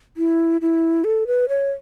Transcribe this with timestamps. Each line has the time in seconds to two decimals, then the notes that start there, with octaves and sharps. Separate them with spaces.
0.17 E4
0.61 E4
1.04 A4
1.27 B4
1.49 C#5